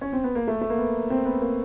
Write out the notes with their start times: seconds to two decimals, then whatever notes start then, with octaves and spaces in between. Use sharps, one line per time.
0.01 C#4
0.13 C4
0.24 B3
0.35 A#3
0.47 A3
0.61 A3
0.70 A#3
0.78 B3
1.10 C4
1.25 B3
1.41 A#3